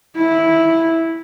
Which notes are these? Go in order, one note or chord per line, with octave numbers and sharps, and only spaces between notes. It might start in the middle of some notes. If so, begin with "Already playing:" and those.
E4